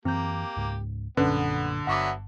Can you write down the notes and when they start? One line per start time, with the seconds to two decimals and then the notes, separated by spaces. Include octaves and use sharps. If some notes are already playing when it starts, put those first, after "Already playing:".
0.05 F#2 E3 A#3 C4 G4 G6
0.57 C#2 G#2
1.17 A#1 F#2 A#2 D3 B3 C#4 B4
1.87 G1 F#3 B3 E5 F#5 C#6 D6